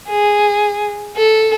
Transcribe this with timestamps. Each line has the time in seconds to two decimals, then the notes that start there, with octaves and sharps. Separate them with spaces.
0.09 G#4
1.17 A4